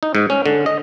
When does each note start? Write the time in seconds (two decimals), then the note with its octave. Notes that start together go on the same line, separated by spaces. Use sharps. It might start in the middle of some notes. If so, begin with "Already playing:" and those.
0.03 D#4
0.15 G#2
0.30 C#4
0.46 D3
0.66 D#5